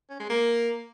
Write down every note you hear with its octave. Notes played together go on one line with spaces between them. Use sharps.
C#4
G#3
A#3